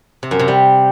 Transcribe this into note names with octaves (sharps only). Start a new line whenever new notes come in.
C3
F#2
C3
G3